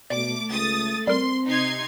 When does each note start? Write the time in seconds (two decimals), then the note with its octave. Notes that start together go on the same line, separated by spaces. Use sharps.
0.10 B2 A3 D5 D6
0.49 C#2 D#6 A6
1.07 G3 C4 A#4 C6
1.47 C3 D#4 C6 G#6